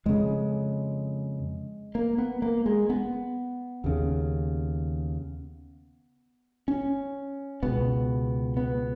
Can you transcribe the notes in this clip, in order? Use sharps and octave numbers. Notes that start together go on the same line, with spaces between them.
F2 C#3 G#3
A#3
B3
A#3
G#3
B3
D#2 C#3
C#4
C#2 B2 B3
B3